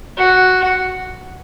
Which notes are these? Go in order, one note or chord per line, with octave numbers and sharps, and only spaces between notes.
F#4